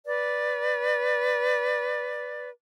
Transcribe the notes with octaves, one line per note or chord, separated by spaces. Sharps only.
B4 D5